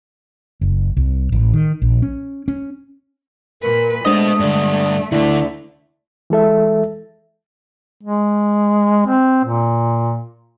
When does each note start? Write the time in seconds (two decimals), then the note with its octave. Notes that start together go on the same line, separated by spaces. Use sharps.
0.61 F#1
0.97 C2
1.32 A1
1.53 D#3
1.82 A#1
2.02 C#4
2.48 C#4
3.62 A#2 A#4 B4
4.05 G#3 A3 B3 D4 C5 D#5 D#6
4.40 G2 D3 D5
5.12 D2 D3 A3 E4 D5
6.30 E3 G#3 A4 E5
8.03 G#3
9.07 C4
9.44 A#2